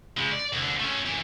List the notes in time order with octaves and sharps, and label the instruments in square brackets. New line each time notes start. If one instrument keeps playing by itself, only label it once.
[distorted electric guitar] C#3 G#3
D5
C2 D3
A3 C#4
F#2 E3